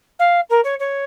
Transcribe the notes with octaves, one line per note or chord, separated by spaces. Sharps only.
F5
A#4
C#5
C#5